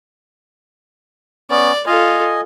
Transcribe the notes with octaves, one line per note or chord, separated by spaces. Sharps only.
B3 C#4 D5
F4 A4 D#5 G#5